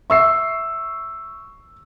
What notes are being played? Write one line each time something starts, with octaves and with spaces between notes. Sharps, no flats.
E5 F#5 C#6 E6 C7